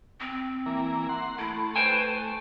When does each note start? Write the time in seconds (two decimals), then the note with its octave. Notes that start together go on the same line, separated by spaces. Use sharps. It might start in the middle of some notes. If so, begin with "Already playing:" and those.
0.20 C4
0.66 E3 A#3
1.09 F#5 C6
1.39 A3 E4
1.76 B4 C5 G5 G#5